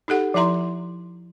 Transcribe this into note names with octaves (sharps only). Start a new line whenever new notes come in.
D#4 G4 A4 F#5
F3 E4 E5 A#5 C6